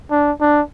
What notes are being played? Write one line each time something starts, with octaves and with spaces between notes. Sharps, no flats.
D4
D4